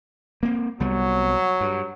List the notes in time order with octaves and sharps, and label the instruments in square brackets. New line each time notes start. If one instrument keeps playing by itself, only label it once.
[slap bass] A#3 C4
[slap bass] C2 G3 B3 [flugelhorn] F#3
[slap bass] G2